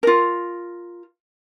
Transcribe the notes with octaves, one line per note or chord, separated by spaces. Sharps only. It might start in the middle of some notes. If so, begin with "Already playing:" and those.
F4 A#4